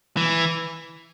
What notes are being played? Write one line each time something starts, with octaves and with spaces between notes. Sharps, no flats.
E3